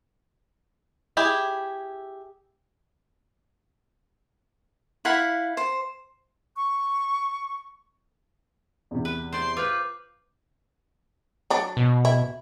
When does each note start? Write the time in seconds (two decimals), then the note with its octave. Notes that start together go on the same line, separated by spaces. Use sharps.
1.17 E4 G4 G#4
5.05 E4 F5 F#5 B5
5.57 C5
6.56 C#6
8.91 E2 C3
9.05 B4
9.33 C5 D5 C6
9.57 F4 B4 D6 F6 G6
11.50 F#3 D4
11.77 B2
12.05 E4